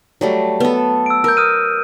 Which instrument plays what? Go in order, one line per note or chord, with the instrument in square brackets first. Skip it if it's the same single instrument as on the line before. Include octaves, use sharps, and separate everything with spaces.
[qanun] F#3 G3 A3
B3 A4
[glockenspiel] E6 D7
[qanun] A#4 [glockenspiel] E6 G6
[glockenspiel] D#6 F6 D#7